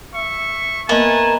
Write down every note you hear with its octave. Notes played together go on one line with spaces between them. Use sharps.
E5 C#6
A#3 B3 A#4 D#5 E5 G#5 A5